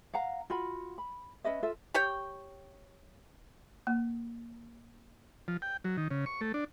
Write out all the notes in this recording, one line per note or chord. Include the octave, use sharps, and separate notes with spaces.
F5 F#5 A#5
F4 F#4 B5
B5
C#4 B4 D#5 E5
F4 A4 E5
G4 C#5 G5
A#3
F3
G5
F#3
D#3
C#3
C#6
A3
D4